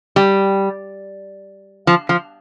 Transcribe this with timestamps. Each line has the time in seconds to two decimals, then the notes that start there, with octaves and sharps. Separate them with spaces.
0.16 G3
1.87 F3
2.09 F3